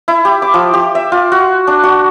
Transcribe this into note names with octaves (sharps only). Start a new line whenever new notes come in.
E4
G4
D6
F3
G4
E5
F4
F#4
D4
F#4